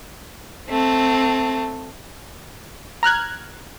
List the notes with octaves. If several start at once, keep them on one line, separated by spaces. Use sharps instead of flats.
A3 C4
A#5 F6 F#6 G#6